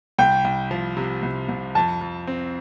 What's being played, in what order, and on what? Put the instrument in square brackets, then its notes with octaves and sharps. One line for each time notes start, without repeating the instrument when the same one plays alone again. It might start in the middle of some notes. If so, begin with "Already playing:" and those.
[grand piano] C2 [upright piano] G5
[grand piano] C2
F3
C3
C2
C2
[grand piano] F2 [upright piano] A5
[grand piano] F2
C4